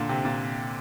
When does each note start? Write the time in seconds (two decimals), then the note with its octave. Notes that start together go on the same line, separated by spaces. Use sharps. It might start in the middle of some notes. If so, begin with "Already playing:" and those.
Already playing: A#2 D3
0.09 C3
0.25 A#2